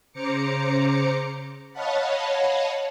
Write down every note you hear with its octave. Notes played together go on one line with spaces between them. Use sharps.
C#3 C5 A#5 D6 C#7
C#5 D#5 F5 F#5 A5 B5